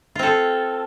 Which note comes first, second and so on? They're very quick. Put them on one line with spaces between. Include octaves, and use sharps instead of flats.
F4 C4 A4